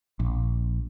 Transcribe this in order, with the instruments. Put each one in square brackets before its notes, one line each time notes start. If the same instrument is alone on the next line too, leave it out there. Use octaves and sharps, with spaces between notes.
[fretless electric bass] A#1